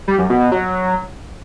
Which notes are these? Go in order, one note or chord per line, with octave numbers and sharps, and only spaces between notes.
G3
F#2
B2
B2
F#3